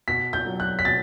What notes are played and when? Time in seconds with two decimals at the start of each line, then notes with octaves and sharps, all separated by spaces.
0.08 B2 B6
0.33 G6
0.46 F#3
0.60 F#6
0.79 B6
0.85 B2 A6